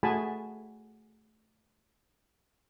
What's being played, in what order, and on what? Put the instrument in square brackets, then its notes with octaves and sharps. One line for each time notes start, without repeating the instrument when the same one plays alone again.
[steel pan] A3 F#4 G#4 G#5 A5 B5